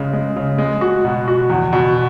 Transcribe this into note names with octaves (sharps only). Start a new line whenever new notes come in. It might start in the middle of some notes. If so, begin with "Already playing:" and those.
Already playing: C#3 G#3
G#3
C#3
G#3
F#4
B2
F#4
E2
B2